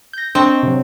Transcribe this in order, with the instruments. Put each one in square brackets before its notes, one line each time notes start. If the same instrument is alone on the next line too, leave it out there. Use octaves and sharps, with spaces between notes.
[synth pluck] G6 A#6
[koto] C4 [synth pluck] D4 D#5 C#6
[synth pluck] C3 F#3